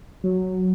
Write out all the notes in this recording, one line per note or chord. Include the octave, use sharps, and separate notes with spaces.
F#3